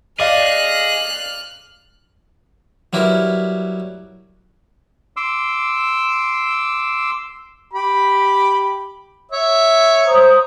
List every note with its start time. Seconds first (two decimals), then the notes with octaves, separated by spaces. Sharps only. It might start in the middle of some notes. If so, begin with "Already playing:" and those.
0.20 G#4 D5 D#5 F5 F6 F#6
2.93 F#3 G3 E4 A#4 B4
5.17 C6 D6 E6
7.73 G4 B5
9.31 C#5 E5
10.06 C5 A#5 D#6